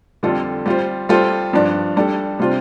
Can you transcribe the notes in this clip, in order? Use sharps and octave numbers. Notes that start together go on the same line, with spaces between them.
F2 D3 G3 F4 A4
G3 F4 C5
G3 F4 A4 C5
G2 F3 D4
G3 D4 A4
C3 G3 D4 F4 C5